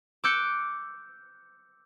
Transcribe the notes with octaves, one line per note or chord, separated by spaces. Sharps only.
D6 E6 F#6 G6 C#7